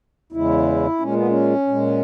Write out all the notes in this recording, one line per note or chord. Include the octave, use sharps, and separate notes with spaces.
E2 C#3 G#3 E4
A#2 G#3 C#4
B3
C#4
A#2 G#3